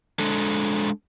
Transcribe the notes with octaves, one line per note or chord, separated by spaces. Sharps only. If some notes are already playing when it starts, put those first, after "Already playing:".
G#3 D4 A4